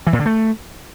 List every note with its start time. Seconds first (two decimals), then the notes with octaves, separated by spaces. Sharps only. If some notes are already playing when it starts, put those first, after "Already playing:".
0.07 E3
0.13 A#2
0.19 D3
0.26 A3